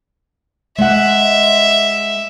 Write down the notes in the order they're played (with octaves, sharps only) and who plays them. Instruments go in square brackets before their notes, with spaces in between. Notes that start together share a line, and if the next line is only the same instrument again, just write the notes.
[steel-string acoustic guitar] G#3 F#5 [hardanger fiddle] E5